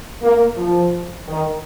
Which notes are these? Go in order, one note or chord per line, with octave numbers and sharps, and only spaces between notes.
A#3
F3
D#3